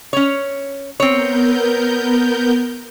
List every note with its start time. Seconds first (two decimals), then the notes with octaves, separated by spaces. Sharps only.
0.13 C#4 C#5
1.00 B3 C4 A#4 C#5 G6